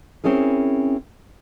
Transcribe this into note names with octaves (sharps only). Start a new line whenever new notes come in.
C4 C#4 E4 G#4 A#4